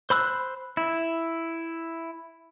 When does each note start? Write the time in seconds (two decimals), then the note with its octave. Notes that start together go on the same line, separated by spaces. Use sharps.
0.10 C5 B5 E6 F#6
0.77 E4